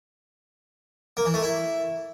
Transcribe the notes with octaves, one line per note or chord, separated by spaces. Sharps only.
A#3
E3
A3
E4